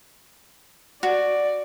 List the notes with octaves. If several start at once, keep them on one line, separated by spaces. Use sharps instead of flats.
F#4 D5